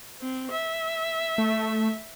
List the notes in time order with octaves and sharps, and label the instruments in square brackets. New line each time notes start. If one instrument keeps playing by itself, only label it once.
[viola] C4
E5
[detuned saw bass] A3